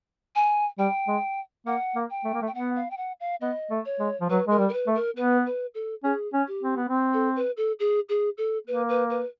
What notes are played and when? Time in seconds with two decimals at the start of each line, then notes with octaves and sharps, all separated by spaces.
0.35 G#5
0.78 G3 G5
1.08 G#3
1.66 A#3 F#5
1.95 A#3
2.10 G5
2.25 A3
2.34 A#3
2.42 A3
2.47 G5
2.55 B3 F#5
2.76 F5
2.91 G5
2.97 F#5
3.20 F5
3.41 B3 D#5
3.71 A3
3.85 C#5
3.99 G#3
4.21 F3
4.30 F#3 B4
4.47 G#3 A#4
4.58 G3
4.69 A#4
4.73 B4
4.87 A3
4.95 A#4
5.17 B3 B4
5.46 B4
5.74 A4
6.04 C#4 G#4
6.33 C#4
6.47 G4
6.63 C4
6.76 B3
6.89 C4
7.13 A4
7.36 B4
7.57 A4
7.79 G#4
8.09 G#4
8.38 A4
8.67 A#3 B4
8.89 B4
9.10 B4